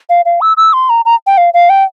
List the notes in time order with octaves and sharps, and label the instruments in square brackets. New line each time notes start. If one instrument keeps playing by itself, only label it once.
[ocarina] F5
F5
E6
E6
C6
A#5
A#5
G5
F5
F5
G5